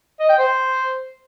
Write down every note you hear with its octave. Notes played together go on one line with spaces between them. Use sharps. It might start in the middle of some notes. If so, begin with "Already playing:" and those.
D#5
G5
C5